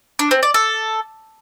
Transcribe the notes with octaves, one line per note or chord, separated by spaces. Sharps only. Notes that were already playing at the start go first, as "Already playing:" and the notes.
D4
C4
D5
A4